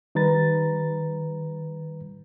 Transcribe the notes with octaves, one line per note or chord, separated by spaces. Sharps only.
D#3 G3 B4 A#5 A6